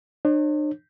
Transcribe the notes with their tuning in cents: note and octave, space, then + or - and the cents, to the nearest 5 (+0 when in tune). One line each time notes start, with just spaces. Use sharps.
D4 +45 C#5 -45